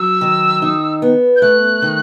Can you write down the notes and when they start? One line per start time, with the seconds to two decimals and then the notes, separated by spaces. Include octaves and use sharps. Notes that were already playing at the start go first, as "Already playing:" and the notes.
Already playing: F#3 E6
0.21 D#3
0.62 D#4
1.02 B3
1.36 G6
1.42 A3 F#6
1.82 D#3